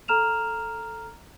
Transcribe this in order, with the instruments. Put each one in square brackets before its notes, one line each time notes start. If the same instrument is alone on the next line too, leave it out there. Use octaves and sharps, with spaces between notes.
[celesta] A4 A#5 F6 E7 F7